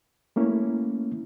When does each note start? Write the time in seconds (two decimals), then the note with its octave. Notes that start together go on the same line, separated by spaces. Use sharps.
0.36 A3 A#3 C#4 E4